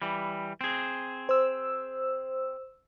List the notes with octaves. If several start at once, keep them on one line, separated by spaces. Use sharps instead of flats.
E3 G3
C4 G#4
C5 E6